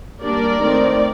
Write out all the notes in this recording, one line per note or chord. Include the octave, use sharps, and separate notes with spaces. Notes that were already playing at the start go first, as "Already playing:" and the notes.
G3 A#3 D4 A#4 D5
D#3 A3 C4